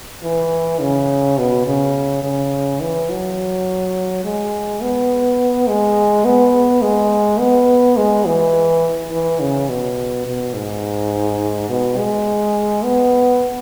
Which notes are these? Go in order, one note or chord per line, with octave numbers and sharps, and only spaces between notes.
E3
C#3
B2
C#3
C#3
E3
F#3
G#3
B3
G#3
B3
G#3
B3
G#3
E3
E3
C#3
B2
B2
G#2
B2
G#3
B3